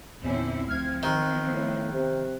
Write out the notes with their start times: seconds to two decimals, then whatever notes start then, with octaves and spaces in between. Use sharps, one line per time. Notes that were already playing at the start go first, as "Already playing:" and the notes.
0.23 E2 A#2 D3 C4 C#4 E4
0.66 D2 F3 C4 F6 G#6
1.03 D#3 F#6
1.51 A2
1.91 C3